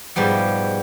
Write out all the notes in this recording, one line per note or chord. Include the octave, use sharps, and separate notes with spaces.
G#2 B2 F3 G3 B3